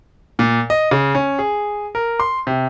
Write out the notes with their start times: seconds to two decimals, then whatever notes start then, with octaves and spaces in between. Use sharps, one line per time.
0.39 A#2
0.70 D#5
0.91 C#3
1.15 C#4
1.39 G#4
1.95 A#4
2.20 C6
2.47 C3